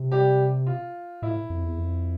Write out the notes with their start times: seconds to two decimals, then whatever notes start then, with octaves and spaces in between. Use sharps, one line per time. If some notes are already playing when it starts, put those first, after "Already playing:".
Already playing: C3
0.12 G3 G4
0.67 F4
1.22 A2 E4
1.50 F2
1.64 E2
1.78 F2